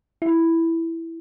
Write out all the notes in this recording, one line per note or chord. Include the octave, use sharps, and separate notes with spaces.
E4